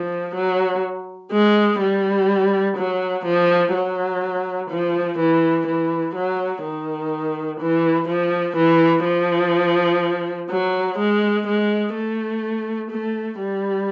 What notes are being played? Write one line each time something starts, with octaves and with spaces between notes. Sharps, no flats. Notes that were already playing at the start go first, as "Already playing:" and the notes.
Already playing: F3
F#3
G#3
G3
F#3
F3
F#3
F3
E3
E3
F#3
D#3
E3
F3
E3
F3
F#3
G#3
G#3
A3
A3
G3